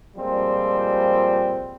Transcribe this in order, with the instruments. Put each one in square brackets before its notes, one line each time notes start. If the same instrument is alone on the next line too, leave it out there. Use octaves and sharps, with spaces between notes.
[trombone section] A#2 F3 G3 G#3 C4